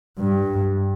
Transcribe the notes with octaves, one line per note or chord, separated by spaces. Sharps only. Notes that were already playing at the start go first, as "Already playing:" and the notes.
G2